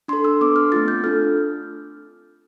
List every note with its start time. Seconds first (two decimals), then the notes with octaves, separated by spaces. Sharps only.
0.08 D4 A4 C6
0.25 E6
0.41 B3 D4 A4 D6
0.56 F6
0.72 A3 C4 F4 A6
0.88 G6
1.04 D4 F4 A4 F6